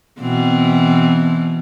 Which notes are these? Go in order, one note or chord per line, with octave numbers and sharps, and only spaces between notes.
B2 E3 C4